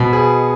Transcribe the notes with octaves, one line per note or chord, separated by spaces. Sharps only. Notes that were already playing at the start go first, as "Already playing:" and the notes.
Already playing: B2 F#4
G#4